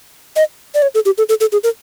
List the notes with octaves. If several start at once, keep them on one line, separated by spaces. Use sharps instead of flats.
D#5
D5
C#5
A4
G4
A4
A4
A4
G#4
A#4